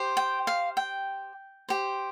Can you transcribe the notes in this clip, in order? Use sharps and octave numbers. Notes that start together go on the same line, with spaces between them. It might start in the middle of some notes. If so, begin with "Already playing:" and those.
Already playing: G4 C5
G5
F5
G5
G4 C5